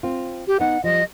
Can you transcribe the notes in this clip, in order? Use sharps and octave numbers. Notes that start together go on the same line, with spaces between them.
C4 F4
G4
B3 D#4 F#5
F3 G3 D#5